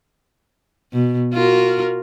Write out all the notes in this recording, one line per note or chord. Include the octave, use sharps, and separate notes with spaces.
B2
F4 F#4 A#4